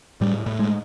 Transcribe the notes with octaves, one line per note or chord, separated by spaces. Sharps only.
A2 G3
A2
G#3